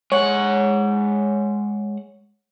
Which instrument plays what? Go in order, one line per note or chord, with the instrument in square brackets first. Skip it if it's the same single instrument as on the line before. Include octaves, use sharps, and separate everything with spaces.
[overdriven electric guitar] G#3 F#5 [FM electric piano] C#5